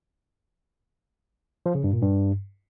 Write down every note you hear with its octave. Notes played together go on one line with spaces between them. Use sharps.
F3
C#3
G2
A#2
G2